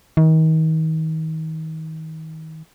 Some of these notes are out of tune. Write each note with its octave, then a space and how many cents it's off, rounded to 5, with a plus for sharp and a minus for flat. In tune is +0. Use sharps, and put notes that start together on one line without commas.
D#3 +35